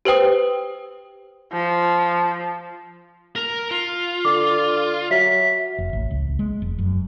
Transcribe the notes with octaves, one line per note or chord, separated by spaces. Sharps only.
G4 B4 C5 G5 D#6
F3
A#4 A#5
F4
D3 D6
F#3 E5 B6
F1
A1
C#2
G#3
F1
F#2